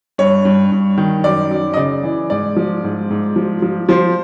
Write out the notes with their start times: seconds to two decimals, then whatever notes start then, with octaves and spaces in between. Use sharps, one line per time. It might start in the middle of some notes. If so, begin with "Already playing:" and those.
0.18 G2 C#5
0.45 G2
0.72 G2
0.98 D#3
1.24 F#2 D5
1.51 F#2
1.74 D#5
1.77 C#3 D5
2.03 E3
2.30 G#2 D5
2.56 F3
2.84 G#2
3.10 G#2
3.36 F3
3.62 F3
3.89 F3 C5